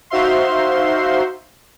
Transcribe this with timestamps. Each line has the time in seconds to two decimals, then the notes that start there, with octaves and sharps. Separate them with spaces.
0.10 D#4 F#4 C5 E5 F5 C6